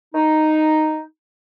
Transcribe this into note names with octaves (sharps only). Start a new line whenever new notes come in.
D#4